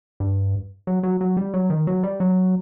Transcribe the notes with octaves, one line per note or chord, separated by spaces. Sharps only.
G2
F#3
F#3
F#3
G3
F#3
D#3
F#3
G3
F#3